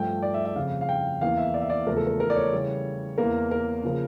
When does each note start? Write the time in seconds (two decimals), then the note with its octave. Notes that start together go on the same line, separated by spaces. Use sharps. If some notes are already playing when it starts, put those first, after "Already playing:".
Already playing: G2 F3 A3 G5
0.23 D5
0.34 E5
0.45 E5
0.55 F2 C#3 G3 F5
0.81 F5
0.89 G5
1.21 E2 E3 A#3 F5
1.38 E5
1.54 D5
1.62 E5
1.70 D5
1.87 E2 C#3 F3 A3 A#4
1.97 A4
2.07 A#4
2.20 A#4
2.30 D5
2.36 C#5
2.53 C#3 E3 G3
3.18 E2 E3 A#3 A#4
3.51 A#4
3.83 C#3 F3 A#3